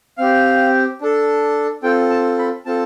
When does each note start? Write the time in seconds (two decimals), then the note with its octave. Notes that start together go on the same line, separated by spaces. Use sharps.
0.18 C4 G4 F5
1.01 D4 A4
1.83 C4 F4 A4 G5
2.10 A5
2.39 B5
2.65 C4 F4 A4 A5